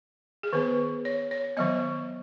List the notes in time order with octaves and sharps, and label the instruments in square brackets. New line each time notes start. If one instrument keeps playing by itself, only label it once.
[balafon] G#4
D#3 B3 B4
C#5
C#5
D#3 F#3 B3 D#5